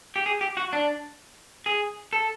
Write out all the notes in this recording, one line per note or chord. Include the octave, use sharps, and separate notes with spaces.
G4
G#4
G4
F#4
D4
G#4
A4